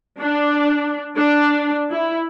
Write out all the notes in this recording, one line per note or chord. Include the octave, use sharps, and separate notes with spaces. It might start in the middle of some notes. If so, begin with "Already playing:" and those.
D4
D4
E4